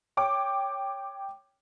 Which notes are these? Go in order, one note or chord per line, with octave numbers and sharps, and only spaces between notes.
C#5 G5 D6